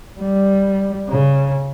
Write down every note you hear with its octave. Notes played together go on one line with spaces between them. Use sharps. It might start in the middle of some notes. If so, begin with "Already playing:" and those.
G3
C#3